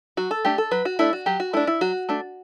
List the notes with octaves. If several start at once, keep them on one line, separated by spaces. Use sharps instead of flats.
F#3 F#4
A4
A3 D4 G4
A4
F#3 B4
F#4
A3 D4 E4
F#4
F#3 G4
F#4
A3 D4 E4
E4
F#3 F#4
A3 D4